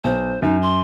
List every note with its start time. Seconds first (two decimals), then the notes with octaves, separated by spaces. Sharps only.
0.04 B1 C5
0.42 F#2 D#4
0.62 C6